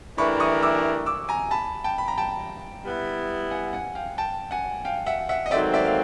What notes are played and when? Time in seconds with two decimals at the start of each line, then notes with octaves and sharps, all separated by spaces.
0.18 E3 A3 D4 G4 A#4 B5 C#6
0.40 C#6 D#6
0.63 D6 E6
1.06 D6 E6
1.29 G#5 A#5
1.51 A5 B5
1.84 G5 A5
1.98 B5
2.08 A#5
2.18 G5 A5
2.84 G3 B3 E4
3.51 F#5 G#5
3.73 F#5 G#5
3.95 F5 G5
4.18 G5 A5
4.51 F#5 G#5
4.85 F5 G5
5.06 E5 F#5
5.29 E5 F#5
5.46 D#5
5.51 G#2 D#3 F#3 A3 C4 D5 E5
5.74 D5 E5
5.85 F5